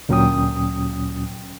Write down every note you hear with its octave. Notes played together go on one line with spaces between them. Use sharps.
D2 A#2 F#3 C#4 G5 D#6